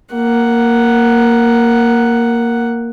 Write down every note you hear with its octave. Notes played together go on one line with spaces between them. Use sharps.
A#3 F#5